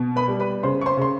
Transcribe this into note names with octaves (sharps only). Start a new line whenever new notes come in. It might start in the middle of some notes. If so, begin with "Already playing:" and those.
Already playing: B2
B4 B5
G3
B4 B5
C#3 C5 C6
C#6
C5 C6
C#3 C6